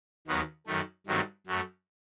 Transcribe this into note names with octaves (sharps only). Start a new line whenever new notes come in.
D#2 D#3 F#3 B3
F#2 D#3 A3
G2 D#3 F#3 A3 C4
F#2 F#3 A3